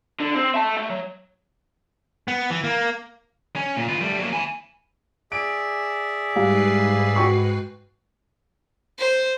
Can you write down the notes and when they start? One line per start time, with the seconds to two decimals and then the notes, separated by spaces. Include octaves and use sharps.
0.20 D3
0.35 C4
0.55 E5 A5
0.77 A3
0.90 F#3
2.28 B3
2.50 E3
2.64 A#3
3.56 C#4
3.77 A#2
3.89 F4 B4
4.01 G3 A3
4.18 F#3 A#3
4.33 G#5 B5
5.32 G#4 D5 E5 D7
6.36 G#2 G3 B4 F5 C7
7.16 F#4 G5 C#6
8.98 C5